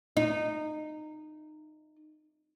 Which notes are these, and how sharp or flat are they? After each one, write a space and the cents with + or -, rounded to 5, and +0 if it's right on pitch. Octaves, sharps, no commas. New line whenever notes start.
D#4 -20